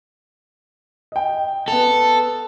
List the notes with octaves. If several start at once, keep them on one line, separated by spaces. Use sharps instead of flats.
D#5 G5
B3 A4 F7